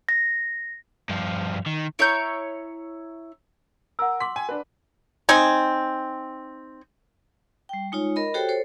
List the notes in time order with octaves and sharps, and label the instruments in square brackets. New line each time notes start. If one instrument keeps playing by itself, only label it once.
[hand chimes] A#6
[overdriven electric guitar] G2 F3
D#3
[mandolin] E4 C#5 A#5 G6
[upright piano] A#4 [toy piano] F#5 E6
[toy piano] C6 D6 [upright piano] B6
[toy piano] G5 [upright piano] G#5
[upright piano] D4 B4
[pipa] C4 D#4 G#5
[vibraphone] G3 G5
G#3 D#4 F4 C#5
A#4 D#5 B5
F#4 G4 A4 C5 C#5 G5
A4 C5 C#5